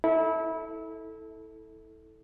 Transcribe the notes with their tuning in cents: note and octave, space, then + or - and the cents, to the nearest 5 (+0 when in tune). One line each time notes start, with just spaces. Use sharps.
E4 -25 A4 +0